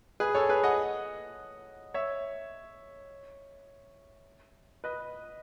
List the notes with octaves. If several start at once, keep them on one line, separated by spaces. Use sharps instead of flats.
G#4 B4
A4 C#5
G#4 B4
D#5 F#5
C#5 E5
B4 D#5